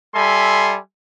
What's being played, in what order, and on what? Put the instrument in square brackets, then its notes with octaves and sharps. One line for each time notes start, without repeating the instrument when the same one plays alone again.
[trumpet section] G3 A4 E5 G#5 B5 C6